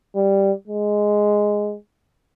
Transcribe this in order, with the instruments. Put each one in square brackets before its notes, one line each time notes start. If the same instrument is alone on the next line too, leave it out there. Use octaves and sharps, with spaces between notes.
[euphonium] G3
G#3